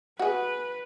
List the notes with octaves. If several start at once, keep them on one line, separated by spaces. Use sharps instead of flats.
F#4 G#4 B4